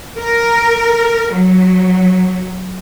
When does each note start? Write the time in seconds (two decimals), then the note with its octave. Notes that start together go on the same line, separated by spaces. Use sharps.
0.18 A#4
1.33 F#3